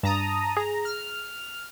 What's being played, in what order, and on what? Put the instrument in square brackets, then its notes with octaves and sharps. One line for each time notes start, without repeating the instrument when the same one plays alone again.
[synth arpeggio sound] G2 [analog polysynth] A5 A#5 D#6
[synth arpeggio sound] G#4 [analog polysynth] A#5
[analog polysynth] F6